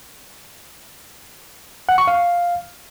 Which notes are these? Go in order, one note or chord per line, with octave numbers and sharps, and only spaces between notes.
F#5
C#6
F5